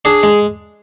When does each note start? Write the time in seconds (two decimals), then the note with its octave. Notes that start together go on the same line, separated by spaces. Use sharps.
0.05 D4 G#4
0.23 G#3